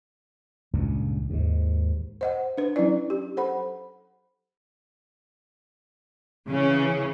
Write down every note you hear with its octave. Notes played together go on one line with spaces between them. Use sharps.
C#2 G2 A#2
D#2 G#2
C5 D#5 F#5
D4 B4
F#3 C#4 E4 D5
G4
A4 C5 F#5 B5
C#3 E3 C#4